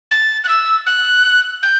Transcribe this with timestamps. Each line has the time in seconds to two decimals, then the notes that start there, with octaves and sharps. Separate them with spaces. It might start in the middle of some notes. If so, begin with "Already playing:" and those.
0.11 A6
0.44 F#6
0.49 E6
0.86 F#6
1.63 G6